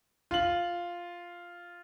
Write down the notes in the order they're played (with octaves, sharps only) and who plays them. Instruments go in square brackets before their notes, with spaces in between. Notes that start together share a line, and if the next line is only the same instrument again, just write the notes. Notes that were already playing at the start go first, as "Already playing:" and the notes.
[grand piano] F4 F#7